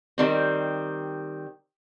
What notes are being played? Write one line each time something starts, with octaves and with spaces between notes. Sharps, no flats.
D#3 G3 C4